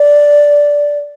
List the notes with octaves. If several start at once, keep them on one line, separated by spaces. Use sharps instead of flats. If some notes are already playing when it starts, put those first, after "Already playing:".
Already playing: D5